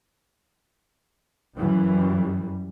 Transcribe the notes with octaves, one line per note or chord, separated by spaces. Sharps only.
F#2 E3 G3